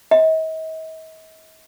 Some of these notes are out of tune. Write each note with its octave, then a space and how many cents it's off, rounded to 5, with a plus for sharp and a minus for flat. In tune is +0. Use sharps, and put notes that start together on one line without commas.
D#5 +45